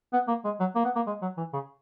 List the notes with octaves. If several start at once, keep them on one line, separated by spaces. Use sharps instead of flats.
B3
A#3
G#3
F#3
A#3
B3
A#3
G#3
F#3
E3
C#3